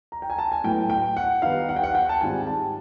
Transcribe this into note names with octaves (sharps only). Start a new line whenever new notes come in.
A#5
G5
G#5
A5
G#5
A2 F#3 B3 G5
G5
F#5
D#3 G3 B3 D#4 F5
F#5
G5
F#5
G5
A5
G#2 D#3 G3 C4 F4 G#5
A5